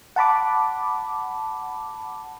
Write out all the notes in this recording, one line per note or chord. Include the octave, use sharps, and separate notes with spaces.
F#5 A5 B5 D6